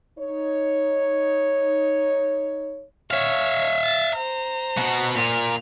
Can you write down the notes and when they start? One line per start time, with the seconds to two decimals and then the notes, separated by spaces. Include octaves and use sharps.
0.18 D#4 C#5
3.11 C#5 E5 F5
3.84 A6
4.15 C5 A#5
4.78 B2 F#4
5.16 A#2 F7